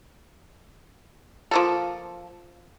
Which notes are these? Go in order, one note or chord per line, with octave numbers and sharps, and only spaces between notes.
F3 A#3 A4